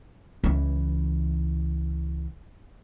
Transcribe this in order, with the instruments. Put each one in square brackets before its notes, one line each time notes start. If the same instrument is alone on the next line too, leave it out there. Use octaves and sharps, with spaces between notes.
[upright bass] C#2 E3